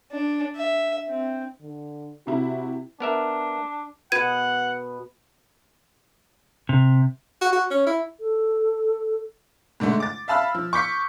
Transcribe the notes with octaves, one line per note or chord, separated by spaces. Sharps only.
D4
E5
C4
D3
C3 E4 F#4
B3 D4 A#4 E5
B2 B3 F#5 G#6 D#7
C3
F#4
F#4
C#4
E4
A4
G#2 D3 G#3 A3
D6 A6
E5 F5 A5 B5 E6 F6
F3
C#6 D6 G6 B6 C#7